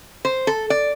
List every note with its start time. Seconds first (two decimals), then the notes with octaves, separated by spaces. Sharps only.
0.25 C5
0.47 A4
0.70 D5